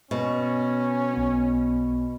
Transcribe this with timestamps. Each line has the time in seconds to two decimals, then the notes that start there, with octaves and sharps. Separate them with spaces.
0.11 B2 C#4
1.14 B1 B3